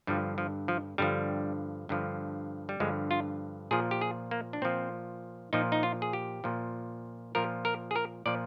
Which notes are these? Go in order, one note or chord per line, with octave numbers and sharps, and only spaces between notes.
G2 D3 F3 G3
F3
F3
G2 D3 F3 G3
G2 D3 F3
G3
G2 D3 F3 G#3
F4
A#2 F3 G#4
G4
G#4
A#3
D4
A#2 F3 C4
A#2 F3 D#4
D#4
F4
G#4
G4
A#2 F3
A#2 F3 A#4
A#4
G#4
A#4
A#2 F3 D5